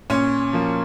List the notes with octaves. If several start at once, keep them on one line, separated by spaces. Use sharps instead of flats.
A#2 C#4 C#5
F3 A#3